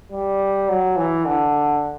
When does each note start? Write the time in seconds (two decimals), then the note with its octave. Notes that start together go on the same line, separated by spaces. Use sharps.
0.12 G3
0.69 F#3
0.97 E3
1.25 D3